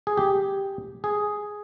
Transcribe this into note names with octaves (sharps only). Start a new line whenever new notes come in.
G#4
G4
G#4